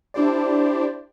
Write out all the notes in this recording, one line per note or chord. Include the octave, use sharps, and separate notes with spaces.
D4 E4 G4 C5 D5